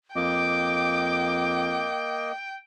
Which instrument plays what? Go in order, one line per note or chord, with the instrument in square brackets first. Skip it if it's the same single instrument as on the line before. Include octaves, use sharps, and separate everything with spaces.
[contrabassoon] F2 [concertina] A#3 D#5 [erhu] G5 [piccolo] D6